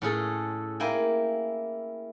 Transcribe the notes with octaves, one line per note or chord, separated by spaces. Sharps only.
A2 C#4 G#4 A4
A#3 E4 G5 G#5